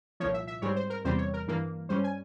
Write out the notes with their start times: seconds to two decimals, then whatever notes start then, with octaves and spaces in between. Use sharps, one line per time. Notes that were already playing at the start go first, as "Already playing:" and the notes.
0.20 C2 A#2 F3 C#5
0.34 E5
0.47 E5
0.62 G#2 G3 C4 C#5
0.76 C5
0.90 A#4
1.05 E2 C3 G3 C4 C5
1.18 C#5
1.34 A#4
1.48 G2 E3 A#3
1.89 G2 G3 C#4 C5
2.04 G#5